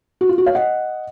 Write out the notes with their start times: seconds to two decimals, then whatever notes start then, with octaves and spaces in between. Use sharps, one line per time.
0.21 F#4
0.29 F4
0.38 F#4
0.46 C#5 F5
0.55 D#5 F#5